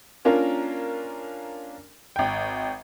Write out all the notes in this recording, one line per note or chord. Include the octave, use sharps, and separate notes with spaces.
A#3 C#4 D4 F4 A#4
G#1 G5